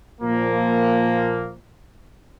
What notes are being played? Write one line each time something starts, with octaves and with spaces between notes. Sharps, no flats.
A#2 F3 A#3